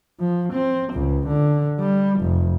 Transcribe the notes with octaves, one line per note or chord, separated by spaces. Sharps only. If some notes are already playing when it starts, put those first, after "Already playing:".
F3
C4
C#2
D3
G3
F1